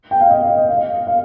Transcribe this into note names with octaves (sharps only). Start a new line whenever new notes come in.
G5
F5
D#5
D#5
F5
F5